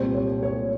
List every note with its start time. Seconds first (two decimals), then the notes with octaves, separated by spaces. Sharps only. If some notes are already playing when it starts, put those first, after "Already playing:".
Already playing: C2 A#2 G3 C4 C5
0.15 C#5
0.43 C#5